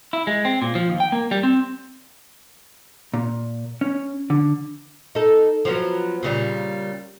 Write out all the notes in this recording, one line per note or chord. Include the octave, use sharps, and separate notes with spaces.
E4
G#3
C4
A#2
F3
D#2
G5
A#3
G3
C4
A#2
C#4
D3
D#4 A4
F3 F#3 B3
A#2 C#3 G3